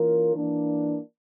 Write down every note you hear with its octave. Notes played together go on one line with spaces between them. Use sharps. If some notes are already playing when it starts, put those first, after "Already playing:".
Already playing: E3 A#3 C#4 F4 A#4
E3 A#3 D4